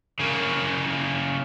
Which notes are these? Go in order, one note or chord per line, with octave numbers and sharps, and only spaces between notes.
C#3 A#3